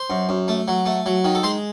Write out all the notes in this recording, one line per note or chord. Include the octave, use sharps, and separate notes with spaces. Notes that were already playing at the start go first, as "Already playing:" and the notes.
Already playing: C5
F#2
F#2
A3
F#3
A3
F#3
D#3
A4
G#3 C5